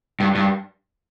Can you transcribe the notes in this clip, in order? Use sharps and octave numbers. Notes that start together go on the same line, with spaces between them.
G2
G2